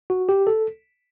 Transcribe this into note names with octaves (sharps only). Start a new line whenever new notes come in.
F#4
G4
A4